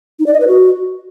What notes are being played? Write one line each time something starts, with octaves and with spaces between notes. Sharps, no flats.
D#4
D5
D#5
B4
F#4